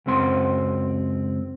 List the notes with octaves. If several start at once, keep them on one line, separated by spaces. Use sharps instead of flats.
C#2 F#2 C4 C6